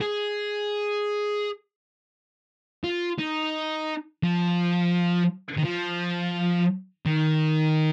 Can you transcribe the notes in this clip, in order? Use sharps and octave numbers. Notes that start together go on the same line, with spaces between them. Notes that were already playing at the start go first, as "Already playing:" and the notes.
G#4
F4
D#4
F3
D#3
F3
D#3